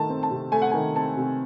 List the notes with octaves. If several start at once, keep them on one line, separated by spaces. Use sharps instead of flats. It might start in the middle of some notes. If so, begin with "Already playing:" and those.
Already playing: D#3 A3 A5
C4
A5
C3
A3 G#5
F#5
D#3 G#5
C4 A5
C3